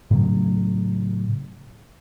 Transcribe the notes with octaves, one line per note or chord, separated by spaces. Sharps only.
A2 C#3 F#3